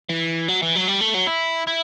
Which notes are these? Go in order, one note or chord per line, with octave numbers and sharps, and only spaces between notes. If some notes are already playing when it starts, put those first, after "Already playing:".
E3
F#3
E3
F#3
G3
A3
F#3
E4
E4